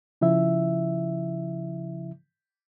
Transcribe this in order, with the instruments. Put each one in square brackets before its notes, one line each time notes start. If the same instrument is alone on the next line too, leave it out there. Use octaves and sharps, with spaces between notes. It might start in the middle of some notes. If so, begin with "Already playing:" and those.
[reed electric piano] C#3 F3 E4 E5